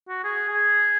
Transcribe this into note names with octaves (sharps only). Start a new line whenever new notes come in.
F#4
G#4
G#4